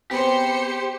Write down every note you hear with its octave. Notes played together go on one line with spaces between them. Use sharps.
B3 C4 G4 G#4 C5 C6 C#7